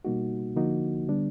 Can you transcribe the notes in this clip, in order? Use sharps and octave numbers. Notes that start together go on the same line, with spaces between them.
B2 G3 A#3 D#4 F#4
D3 F3 A#3 D#4 F#4
D3 G3 B3 D4